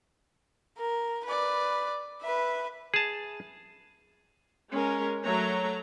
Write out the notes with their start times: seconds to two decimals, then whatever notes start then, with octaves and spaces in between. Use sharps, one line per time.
0.78 A#4
1.25 B4 D5
2.22 B4 E5
2.94 G#4 A5
4.70 G#3 C#4 A#4
5.23 F#3 A3 C#5 A#5